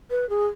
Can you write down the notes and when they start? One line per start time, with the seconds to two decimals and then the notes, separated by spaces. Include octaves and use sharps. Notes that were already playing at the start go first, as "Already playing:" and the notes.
0.11 B4
0.30 G#4